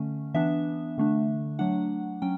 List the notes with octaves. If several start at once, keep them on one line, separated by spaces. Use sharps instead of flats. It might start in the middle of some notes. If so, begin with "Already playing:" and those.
Already playing: D3 A3 C#4
E3 B3 D4 E5
D3 A3 D4
F#3 A3 D4 F#5
F#3 C#4 G5